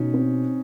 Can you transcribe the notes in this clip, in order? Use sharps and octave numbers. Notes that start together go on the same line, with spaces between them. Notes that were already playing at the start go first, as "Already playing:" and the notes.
Already playing: B2 C#4 D#4
C4